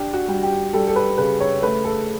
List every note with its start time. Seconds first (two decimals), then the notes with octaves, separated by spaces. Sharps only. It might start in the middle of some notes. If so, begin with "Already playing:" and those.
Already playing: D4 G4
0.13 F#4
0.28 G3
0.43 G4
0.73 G3 A4
0.88 A4
0.96 B4
1.18 C#3 B4
1.40 C#5
1.62 A3 B4
1.85 A4